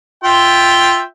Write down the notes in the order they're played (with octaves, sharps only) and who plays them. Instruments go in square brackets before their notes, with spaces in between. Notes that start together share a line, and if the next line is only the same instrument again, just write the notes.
[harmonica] F4 E5 G5